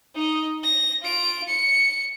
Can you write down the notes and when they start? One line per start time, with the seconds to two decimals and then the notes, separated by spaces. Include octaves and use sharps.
0.15 D#4 D#5
0.63 A#6
1.02 F4 D7
1.48 C#7